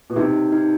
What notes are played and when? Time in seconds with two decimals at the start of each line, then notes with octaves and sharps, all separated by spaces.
0.10 B2
0.16 C3 D#4
0.52 D#4